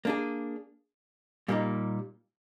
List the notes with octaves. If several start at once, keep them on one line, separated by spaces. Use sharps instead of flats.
A#3 D4 G#4
A#2 G3 A#3 D#4